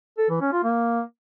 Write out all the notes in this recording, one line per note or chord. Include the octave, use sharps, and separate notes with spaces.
A4
E3
C#4
F4
A#3